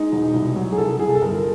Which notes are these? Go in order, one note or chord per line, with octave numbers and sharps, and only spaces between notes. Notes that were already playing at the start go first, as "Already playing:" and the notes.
Already playing: G#3 D#4
E1
C2
F#3
G#4
C2 A4
C2 G#4
A4
G1 A#4